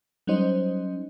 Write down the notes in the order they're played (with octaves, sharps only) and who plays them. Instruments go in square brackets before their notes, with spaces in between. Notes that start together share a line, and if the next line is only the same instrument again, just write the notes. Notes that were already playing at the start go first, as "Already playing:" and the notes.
[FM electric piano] F#3 G3 C#4 D#4 C5 D#5